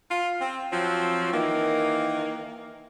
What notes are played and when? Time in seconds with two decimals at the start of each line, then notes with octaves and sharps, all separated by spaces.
0.11 F4
0.41 C4
0.73 F3 F#3 C4
1.33 D#3 E3 A#3